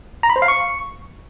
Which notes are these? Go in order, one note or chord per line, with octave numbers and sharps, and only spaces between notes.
A#5
B5
C5
F5
C#6